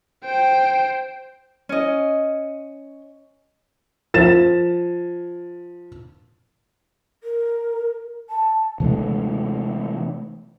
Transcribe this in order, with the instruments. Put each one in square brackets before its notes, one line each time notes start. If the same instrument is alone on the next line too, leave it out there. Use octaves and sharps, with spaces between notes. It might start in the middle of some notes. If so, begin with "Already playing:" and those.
[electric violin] C5 G5
[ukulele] C#4 D#5
[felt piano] F3 A6 E7
[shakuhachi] A#4
A5
[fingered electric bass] C3 E3 G#3 A3